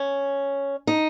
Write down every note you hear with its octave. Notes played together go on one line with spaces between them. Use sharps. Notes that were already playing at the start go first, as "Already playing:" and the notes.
Already playing: C#4
D#4